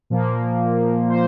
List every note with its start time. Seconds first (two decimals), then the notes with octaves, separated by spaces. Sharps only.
0.10 A#2 F3 A#3
1.09 C5